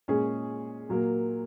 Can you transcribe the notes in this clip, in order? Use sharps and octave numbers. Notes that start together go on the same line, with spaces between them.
A#2 G#3 C#4 G#4
A#2 F#3 A#3